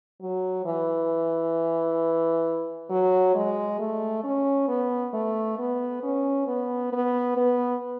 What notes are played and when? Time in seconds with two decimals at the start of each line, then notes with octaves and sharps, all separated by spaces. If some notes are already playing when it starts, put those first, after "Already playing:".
0.21 F#3
0.65 E3
2.90 F#3
3.35 G#3
3.79 A3
4.24 C#4
4.68 B3
5.14 A3
5.58 B3
6.03 C#4
6.47 B3
6.93 B3
7.36 B3